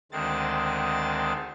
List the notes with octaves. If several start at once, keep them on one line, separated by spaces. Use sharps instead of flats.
D2 D#3 G#3 C4 A6